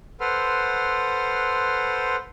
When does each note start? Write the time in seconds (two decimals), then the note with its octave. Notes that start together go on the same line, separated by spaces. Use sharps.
0.20 A4 B4 C5 F#5 C6 F6